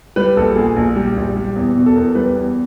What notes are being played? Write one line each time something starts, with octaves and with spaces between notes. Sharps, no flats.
G3 B4
A#1 A4
A#2 G#4
A#1
G3
A#1
G3
E2
B2
A4
E2 A#4
G3 B4
E2